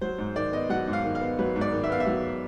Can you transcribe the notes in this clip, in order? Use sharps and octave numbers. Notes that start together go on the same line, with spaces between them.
F#3 C5
G#2
D#3 D5
B3 D#5
F#3 F#5
G#2
F5
D#3
F5
B3
F#3 B4
G#2
D5
D#3
E5
B3 F5
E5
F#3